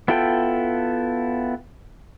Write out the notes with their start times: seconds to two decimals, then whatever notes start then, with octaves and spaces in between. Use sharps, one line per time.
0.08 B3 E4 F4 A4 G5